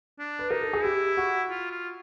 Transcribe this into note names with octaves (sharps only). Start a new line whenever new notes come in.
D4
B4
D#4 A#4
A4
G#4
E4 G4
F#4
F4
F4